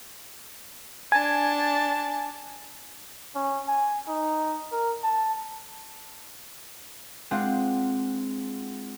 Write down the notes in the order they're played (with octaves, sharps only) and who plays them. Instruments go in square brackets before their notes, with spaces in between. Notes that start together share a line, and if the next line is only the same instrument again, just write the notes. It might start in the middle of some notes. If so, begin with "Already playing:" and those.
[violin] D4 A5 [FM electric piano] G#5
[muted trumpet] C#4
G#5
D#4
A#4
A5
[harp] G#3 C4 D4 F4 F#5